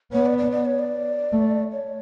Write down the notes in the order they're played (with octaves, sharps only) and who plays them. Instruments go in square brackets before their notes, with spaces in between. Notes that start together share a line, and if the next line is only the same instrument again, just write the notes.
[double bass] B3 [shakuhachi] C#5
[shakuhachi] D5
D5
D5
C#5
D5
[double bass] A3
[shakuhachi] C#5